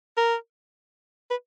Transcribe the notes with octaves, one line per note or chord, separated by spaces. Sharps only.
A#4
B4